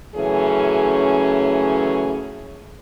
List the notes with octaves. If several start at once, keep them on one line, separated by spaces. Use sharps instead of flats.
C#3 E3 F#3 A3 C#4 G#4